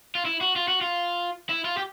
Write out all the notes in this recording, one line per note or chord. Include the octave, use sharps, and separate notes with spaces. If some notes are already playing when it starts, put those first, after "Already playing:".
F4
E4
F#4
F4
F#4
F4
E4
F4
G4